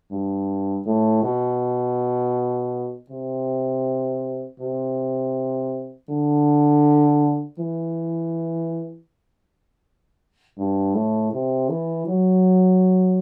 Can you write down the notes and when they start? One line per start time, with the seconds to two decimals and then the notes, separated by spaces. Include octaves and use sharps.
0.11 G2
0.86 A2
1.23 B2
3.10 C3
4.59 C3
6.09 D3
7.58 E3
10.58 G2
10.95 A2
11.33 C3
11.69 E3
12.07 F#3